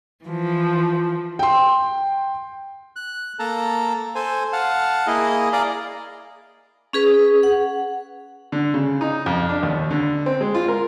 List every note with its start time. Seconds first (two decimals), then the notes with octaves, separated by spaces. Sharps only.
0.23 E3 F3
1.39 G5 C6
2.96 F#6
3.39 A#3 A4 A5 A#5
4.15 A4 C5 G#5
4.53 F5 F#5 A5
5.07 A#3 E4 G#4 D#5
5.53 G#4 D5 F5 A#5
6.93 C#4 G#4 B4
7.43 F#5
8.52 D3
8.74 C#3
9.01 D#4
9.26 F2
9.49 D4
9.63 D#2
9.91 D3
10.26 C4
10.41 G#3
10.55 F4
10.68 A#4